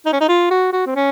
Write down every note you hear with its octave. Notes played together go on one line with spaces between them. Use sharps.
D#4
C#4
D#4
F4
F#4
F#4
C4
C#4